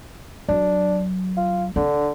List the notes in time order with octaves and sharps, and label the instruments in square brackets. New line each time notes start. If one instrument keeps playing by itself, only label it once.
[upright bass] F#3 [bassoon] D4
[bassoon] F4
[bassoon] D3 [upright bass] D4